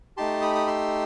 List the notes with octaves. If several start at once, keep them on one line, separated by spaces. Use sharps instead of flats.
A3 D#4 G4 A5 C6
B5 D#6
D#6
C6 E6